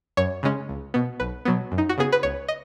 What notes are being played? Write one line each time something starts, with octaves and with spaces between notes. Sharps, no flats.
F#2 C#5
C#3 G#3 C#4
C#2
B2 B3
B1 B4
B2 F#3 B3
F#2
D#4
F#4
C#3 B3 G#4
B4
C#2 C#5
D#5